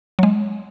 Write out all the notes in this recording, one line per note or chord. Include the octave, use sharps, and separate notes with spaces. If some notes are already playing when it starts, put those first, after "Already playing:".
F#3
G#3